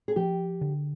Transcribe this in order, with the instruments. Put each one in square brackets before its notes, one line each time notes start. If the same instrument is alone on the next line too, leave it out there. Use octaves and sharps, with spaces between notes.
[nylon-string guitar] G#4
[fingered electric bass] F3 [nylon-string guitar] G4
[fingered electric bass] D3